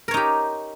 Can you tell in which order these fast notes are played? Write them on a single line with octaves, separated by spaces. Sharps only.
A#4 C#5 D#4 G4